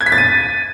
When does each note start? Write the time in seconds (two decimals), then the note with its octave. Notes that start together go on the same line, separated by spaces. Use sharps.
0.01 G#6
0.06 B6
0.12 A6
0.18 D#7